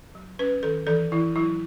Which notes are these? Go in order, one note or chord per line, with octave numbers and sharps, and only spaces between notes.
F#3
C#4 B4
D#3 A4
E3 A4
E3 E4
F#3 E4